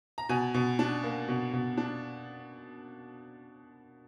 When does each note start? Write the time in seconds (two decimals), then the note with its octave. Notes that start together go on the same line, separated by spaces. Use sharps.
0.18 A#5
0.29 B2 G#5
0.54 B2
0.79 D4
1.04 A#3
1.28 B2
1.53 B2
1.77 D4